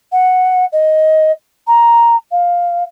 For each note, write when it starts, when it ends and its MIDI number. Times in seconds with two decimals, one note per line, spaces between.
0.12 0.65 78
0.72 1.31 75
1.67 2.15 82
2.31 2.83 77